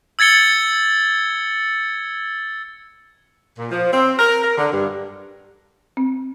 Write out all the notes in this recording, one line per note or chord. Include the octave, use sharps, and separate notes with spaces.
E6 G#6 A6 C#7 G7
A#2
F3
C4
A#4
A#4
D3
G2
C4